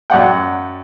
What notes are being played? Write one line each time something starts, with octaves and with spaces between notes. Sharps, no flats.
F#2 D5 F#5 G5